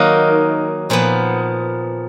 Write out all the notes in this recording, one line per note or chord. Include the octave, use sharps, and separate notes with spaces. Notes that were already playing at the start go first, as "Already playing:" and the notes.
Already playing: D#3 F#3 A#3 D#4 A#4
A#2 F3 B3